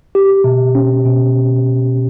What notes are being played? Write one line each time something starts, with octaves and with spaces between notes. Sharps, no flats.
G4
B2
C#4
B2